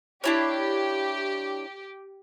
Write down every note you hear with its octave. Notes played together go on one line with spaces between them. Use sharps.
D4 E4 G4 C#5